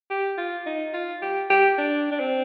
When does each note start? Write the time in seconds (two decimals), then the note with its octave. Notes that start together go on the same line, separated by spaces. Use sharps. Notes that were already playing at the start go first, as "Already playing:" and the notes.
0.10 G4
0.38 F4
0.66 D#4
0.94 F4
1.22 G4
1.50 G4
1.78 D4
2.11 D4
2.20 C4